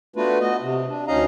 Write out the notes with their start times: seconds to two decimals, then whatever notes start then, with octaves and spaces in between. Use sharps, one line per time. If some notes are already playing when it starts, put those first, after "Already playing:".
0.16 A3 B3 D4 F4 F#4 B4
0.41 F#4 D#5
0.62 C3
0.88 D4
1.07 D2 C#4 D#4 D#5 F5 A#5